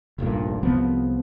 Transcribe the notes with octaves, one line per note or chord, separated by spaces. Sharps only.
F1 A#1 G2 A#2
C2 F3 B3 C4